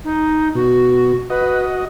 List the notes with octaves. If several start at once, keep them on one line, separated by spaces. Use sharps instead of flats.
D#4
B2 F#4
F#4 B4 D#5